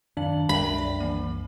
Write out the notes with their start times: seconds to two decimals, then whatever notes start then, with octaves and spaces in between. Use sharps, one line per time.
0.17 F#2 D#3 D4 F5 F#7
0.49 C2 F#2 G3 A#4 E5 G5 B5
0.78 D5
1.00 E3 A#3